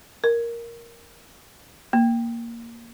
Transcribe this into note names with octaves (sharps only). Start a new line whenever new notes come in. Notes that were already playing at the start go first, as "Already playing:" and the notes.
A#4
A#3